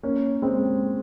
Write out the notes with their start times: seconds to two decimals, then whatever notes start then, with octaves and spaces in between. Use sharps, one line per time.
0.03 A#3 C#4
0.42 G#3 C4